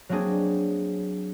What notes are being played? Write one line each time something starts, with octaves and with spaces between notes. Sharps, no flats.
F#3 A#3 C4 D4 G#4